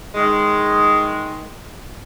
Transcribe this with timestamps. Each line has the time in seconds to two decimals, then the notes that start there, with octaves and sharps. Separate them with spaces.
0.15 D#3 G#3